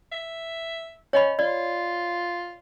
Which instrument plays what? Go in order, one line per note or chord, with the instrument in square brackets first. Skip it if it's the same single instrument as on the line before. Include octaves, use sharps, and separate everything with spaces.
[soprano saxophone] E5
[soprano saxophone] C#4 [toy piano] C#5 D#5 B5
[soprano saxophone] F4 [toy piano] D5